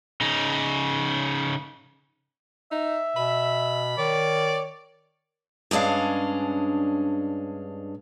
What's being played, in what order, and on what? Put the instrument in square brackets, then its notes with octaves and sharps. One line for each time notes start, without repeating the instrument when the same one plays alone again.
[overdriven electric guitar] C#3 D#4
[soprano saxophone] D#4 [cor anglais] E5
[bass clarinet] B2 [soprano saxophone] B5
[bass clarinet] D#3 [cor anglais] C#5 [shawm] D5
[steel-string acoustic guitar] G2 G#3 C#4 D4 F5